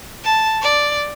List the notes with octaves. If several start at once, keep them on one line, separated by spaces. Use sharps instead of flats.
A5
D5